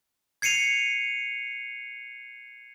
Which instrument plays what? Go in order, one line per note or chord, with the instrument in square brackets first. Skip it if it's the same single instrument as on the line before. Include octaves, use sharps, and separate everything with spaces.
[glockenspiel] G#6 C7 C#7 D#7 F7